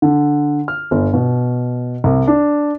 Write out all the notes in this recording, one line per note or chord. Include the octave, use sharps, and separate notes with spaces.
D3
F6
G1
B2
C2
D4